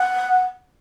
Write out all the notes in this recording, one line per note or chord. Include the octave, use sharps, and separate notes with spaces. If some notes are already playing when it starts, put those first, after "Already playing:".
Already playing: F#5